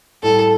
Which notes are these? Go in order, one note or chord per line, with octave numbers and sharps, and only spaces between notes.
A2 G3 E4 A4